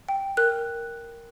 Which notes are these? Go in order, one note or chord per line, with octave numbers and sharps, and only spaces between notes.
G5
A#4 F#6